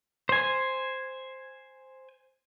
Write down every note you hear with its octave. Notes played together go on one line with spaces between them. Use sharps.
C5 G#5